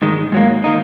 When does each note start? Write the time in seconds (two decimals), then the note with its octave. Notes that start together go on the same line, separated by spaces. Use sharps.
0.02 G#2 D#3 G#3
0.32 G#2 F#3 A#3
0.64 D#3 A#3 D#4